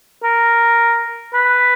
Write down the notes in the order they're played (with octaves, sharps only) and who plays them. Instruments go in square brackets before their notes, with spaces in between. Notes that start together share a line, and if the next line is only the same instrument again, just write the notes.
[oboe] A#4
B4